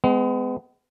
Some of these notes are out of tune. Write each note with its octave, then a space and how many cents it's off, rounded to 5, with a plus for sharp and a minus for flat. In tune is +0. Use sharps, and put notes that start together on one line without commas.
G#3 +0 B3 +35